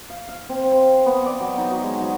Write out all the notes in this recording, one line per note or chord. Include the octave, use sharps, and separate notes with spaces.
F5
F5
C4
C6
B3
D5
F#3
D#4
F#4
G#3
F#3